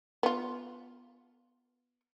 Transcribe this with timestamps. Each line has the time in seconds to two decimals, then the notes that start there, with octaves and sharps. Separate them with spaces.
0.23 B3 F4